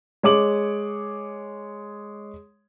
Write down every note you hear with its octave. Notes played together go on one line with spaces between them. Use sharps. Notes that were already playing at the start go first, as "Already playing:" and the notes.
G#3 C#5 D6 F#7